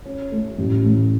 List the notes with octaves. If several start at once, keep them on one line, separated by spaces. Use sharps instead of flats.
C#4
A3
A1
A2